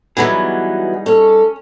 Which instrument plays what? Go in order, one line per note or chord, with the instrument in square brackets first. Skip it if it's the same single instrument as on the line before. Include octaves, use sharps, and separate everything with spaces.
[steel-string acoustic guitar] E3 F#3 B3 [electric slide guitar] G3 D#4 G#4
[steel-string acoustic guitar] C#4 [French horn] A4